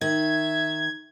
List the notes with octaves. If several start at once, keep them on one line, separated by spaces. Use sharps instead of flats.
D#3 E5 G#6